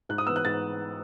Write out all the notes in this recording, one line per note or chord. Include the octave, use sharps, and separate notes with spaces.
G#2 F#6
D#6
E3 B3 E6
F#6
G#2 A6